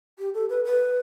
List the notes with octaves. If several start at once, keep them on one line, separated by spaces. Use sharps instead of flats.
G4
A4
B4
B4